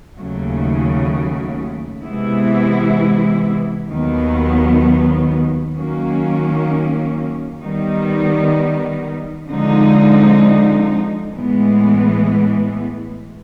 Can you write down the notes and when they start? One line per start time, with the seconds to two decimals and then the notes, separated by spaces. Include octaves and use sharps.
0.17 D#2 C#3 F#3 A3
2.02 C3 E3 G#3 B3 E4
3.88 D#2 D#3 F#3 B3
5.75 D#3 F#3 A#3 C#4
7.61 D#3 G3 B3 D#4
9.47 D3 F3 G#3 C4 D#4
11.33 A2 E3 G#3 B3